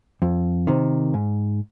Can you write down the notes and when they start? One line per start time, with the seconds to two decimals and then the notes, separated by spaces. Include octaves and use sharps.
0.22 F2
0.67 C3 D#3
1.14 G#2